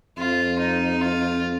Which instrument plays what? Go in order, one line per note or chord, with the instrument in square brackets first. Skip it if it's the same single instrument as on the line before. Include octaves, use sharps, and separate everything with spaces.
[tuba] F2 [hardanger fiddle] F4
[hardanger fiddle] D#4
F4